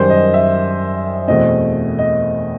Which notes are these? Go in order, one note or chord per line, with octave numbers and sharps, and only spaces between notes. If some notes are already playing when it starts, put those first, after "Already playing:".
Already playing: F#2 D#3 G3 C5
D#5
E5
E2 B2 A3 C4 D#5
D#5